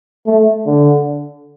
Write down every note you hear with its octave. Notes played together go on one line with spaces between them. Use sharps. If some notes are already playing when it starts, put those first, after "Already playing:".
A3
D3